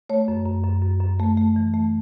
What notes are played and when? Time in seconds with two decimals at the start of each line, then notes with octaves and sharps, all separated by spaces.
0.09 A3 C#5
0.28 F#2
0.45 F#2
0.64 F#2
0.82 F#2
1.01 F#2
1.20 A3
1.37 A3
1.56 E3
1.74 A3